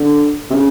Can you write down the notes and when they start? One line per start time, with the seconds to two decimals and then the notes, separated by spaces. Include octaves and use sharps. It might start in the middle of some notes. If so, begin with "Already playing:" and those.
Already playing: D3
0.51 C3
0.55 C#3